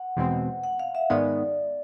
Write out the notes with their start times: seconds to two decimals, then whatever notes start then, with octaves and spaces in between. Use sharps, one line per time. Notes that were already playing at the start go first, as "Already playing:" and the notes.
Already playing: F#5
0.17 E2 B2 G#3 C4
0.64 F#5
0.80 F5
0.95 E5
1.10 G#2 D#3 G#3 B3 D5